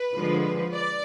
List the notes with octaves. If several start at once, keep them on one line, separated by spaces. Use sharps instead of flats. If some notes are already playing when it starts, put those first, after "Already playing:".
Already playing: B4
D3 F3 G#3
D5